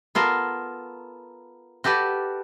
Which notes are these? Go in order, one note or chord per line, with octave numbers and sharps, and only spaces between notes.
B3 F4 A4 A#4
F#4 G4 A4 B4 D5